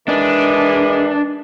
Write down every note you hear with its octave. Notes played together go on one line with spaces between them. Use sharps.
D#3 E3 G#3 D4